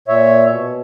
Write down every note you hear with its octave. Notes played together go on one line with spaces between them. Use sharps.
A#2 C#5 E5
B2